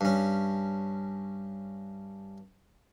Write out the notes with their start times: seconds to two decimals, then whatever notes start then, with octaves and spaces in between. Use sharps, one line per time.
0.01 G2 C#4